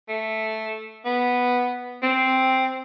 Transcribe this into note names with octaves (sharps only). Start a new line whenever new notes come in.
A3
B3
C4